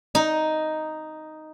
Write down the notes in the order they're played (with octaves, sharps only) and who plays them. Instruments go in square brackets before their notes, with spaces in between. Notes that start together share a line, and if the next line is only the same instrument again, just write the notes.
[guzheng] D#4